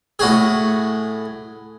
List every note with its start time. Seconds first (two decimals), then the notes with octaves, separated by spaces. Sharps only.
0.19 A2 F#4 G#4